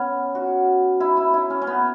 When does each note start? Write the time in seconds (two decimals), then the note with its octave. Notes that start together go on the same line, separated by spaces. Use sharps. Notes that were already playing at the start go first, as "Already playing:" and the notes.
Already playing: B3 C#4
0.35 F#4
1.00 E4
1.17 E4
1.34 E4
1.50 C#4
1.62 C#4
1.67 B3